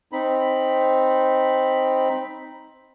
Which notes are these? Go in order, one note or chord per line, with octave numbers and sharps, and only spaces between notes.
C4 D#4 B5